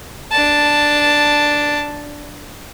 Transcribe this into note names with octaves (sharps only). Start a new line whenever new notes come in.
D4 A5